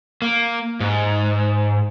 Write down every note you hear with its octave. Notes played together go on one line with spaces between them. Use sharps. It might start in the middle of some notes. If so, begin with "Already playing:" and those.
A#3
G#2